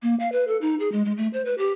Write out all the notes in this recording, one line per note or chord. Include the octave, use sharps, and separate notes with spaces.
A#3
F5
B4
A4
D#4
G#4
G#3
G#3
A3
C5
B4
G4